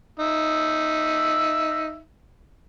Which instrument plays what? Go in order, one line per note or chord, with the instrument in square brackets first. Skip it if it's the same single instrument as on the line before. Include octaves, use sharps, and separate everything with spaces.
[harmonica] D#4 E5